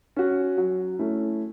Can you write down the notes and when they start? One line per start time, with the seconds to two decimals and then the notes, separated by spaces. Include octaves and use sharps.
0.16 C#4 F#4
0.58 F#3
0.99 A3 C#4 E4